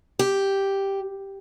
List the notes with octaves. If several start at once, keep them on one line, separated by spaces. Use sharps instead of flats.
G4